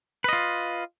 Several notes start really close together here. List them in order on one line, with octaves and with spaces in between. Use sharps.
B4 D#5 F4